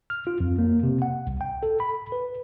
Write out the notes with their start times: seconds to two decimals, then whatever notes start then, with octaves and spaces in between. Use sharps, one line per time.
0.10 F6
0.27 F4
0.40 F2
0.58 A#3
0.83 C3
1.02 F#5
1.27 C2
1.41 G5
1.63 A4
1.80 B5
2.12 B4